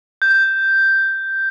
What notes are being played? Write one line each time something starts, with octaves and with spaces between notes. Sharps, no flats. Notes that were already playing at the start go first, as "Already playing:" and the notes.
G6